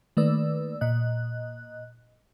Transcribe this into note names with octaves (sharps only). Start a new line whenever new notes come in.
D#3 A3 A#3 B4 D5 E6
A#2 D#5 F#6